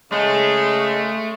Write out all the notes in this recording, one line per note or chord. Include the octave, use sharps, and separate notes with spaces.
C#3 G#3 A3